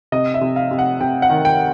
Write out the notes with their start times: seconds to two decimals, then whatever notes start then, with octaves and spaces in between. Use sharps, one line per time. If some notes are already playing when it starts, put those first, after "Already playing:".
0.12 C3 D#5
0.34 E5
0.41 C3
0.56 F5
0.71 C3
0.79 F#5
1.01 C3 G5
1.22 F#5
1.30 D#3
1.45 G5